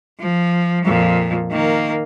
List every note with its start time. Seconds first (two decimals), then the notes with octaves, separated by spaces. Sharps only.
0.19 F3
0.85 F2 A#2
1.51 D#3 A#3